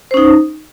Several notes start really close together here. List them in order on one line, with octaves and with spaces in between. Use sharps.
C5 C#4 D#4